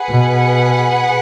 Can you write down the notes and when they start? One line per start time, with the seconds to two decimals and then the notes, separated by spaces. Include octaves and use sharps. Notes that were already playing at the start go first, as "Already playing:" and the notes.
Already playing: G#4 B4 F#5
0.09 B2